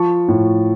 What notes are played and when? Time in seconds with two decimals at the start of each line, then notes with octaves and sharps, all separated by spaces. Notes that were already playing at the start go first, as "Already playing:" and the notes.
Already playing: F3 A5 C#6
0.28 A2